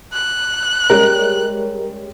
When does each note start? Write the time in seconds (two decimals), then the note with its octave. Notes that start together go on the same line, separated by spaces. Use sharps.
0.13 F#6
0.90 G3 G#3 C#4 A#4